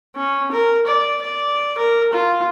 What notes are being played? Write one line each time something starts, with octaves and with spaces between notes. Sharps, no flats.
C#4
A#4
D5
D5
A#4
F4